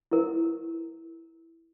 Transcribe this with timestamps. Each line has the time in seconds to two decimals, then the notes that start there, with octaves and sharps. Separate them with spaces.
0.11 E4 A#4